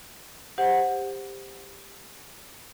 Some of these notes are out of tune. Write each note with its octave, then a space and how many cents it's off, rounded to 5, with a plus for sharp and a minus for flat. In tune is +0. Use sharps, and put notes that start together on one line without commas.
G4 +15 C5 +0 F#5 -10